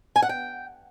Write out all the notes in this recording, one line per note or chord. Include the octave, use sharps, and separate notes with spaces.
G#5
F#5
G5